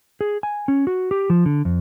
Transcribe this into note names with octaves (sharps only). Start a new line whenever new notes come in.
G#4
G#5
C#4
F#4
G4
F3
D3
F2